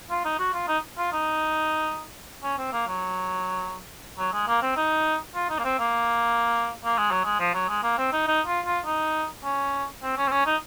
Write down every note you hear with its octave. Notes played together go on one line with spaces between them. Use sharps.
F4
D#4
F#4
F4
D#4
F4
D#4
C#4
C4
A#3
F#3
F#3
G#3
A#3
C4
D#4
F4
D#4
A#3
C4
A#3
A#3
G#3
F#3
G#3
F3
F#3
G#3
A#3
C4
D#4
D#4
F4
F4
D#4
C#4
C4
C#4
C4
C#4
D#4